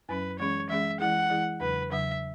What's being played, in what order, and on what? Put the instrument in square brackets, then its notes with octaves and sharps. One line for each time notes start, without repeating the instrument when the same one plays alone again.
[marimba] F#2 F#3 C#4 [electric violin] B4
[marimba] E3 G#3 C#4 G#4 [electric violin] C#5
[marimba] E3 G#3 C#4 G#4 [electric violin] E5
[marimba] E3 G#3 E4 G#4 [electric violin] F#5
[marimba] E3 G#3 E4 G#4
[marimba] E2 C#3 F#3 [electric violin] B4
[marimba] E2 C#3 F#3 [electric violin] E5